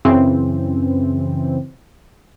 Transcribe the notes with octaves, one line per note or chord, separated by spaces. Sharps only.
F#2 C#3 E3 C4